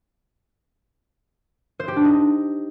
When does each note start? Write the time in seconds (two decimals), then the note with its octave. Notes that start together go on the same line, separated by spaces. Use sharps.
1.80 C5
1.88 G4
1.96 D4
2.05 D#4